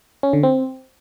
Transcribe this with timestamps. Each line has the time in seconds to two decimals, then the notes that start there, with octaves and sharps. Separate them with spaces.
0.23 C#4
0.33 D3
0.43 C4